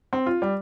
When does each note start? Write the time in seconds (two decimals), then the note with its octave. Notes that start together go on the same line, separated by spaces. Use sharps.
0.13 C4
0.26 F4
0.42 G3